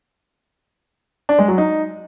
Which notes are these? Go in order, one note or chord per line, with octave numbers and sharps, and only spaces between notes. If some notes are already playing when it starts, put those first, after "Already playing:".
D4
G#3
F#3
D#4